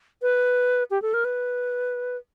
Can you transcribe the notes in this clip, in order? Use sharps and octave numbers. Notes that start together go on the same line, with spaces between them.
B4
G4
A4
A#4
B4